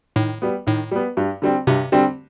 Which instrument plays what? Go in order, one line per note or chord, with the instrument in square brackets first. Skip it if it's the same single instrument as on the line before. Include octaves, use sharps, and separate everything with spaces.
[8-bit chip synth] A2 [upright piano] D#3
[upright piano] G3 B3
[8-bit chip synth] A2 [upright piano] D#3
[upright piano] G3 B3
G2
D3 G3 C4
[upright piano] G2 [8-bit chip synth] C3
[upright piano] D3 G3 C4